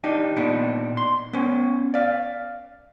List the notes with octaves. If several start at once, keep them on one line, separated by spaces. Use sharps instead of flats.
D4 D#4 G4
A#2 B3 D4 D#4
C6
B3 C#4
D5 F5